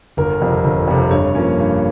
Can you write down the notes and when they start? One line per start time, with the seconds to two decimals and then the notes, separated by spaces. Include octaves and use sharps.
0.17 G1 A#4
0.41 F2 C3
0.64 G1
0.88 F2 C3
1.11 G2 C#5
1.35 F3 A#3 C#4
1.59 G2